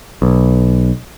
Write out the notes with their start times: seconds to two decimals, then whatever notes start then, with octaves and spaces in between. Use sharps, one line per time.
0.22 B1